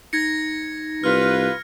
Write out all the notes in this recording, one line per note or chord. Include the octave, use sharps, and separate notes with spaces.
D#4 G#6 A#6 C#7
C2 F4 B4 F6